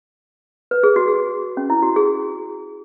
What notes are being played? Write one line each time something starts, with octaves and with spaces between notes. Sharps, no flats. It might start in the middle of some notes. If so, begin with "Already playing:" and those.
B4
G#4
F#4
G#4
C#4
E4
F#4
G#4